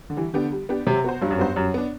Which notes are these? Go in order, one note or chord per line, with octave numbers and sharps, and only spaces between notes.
D3
E3 G3
D3 B3 D4 G4
G3
B3 D4 G4
C3 F#3
B3 F#4 C5
G2 F#3
F#2
G2 B3 F#4 C5
F#2 G3
B3 D4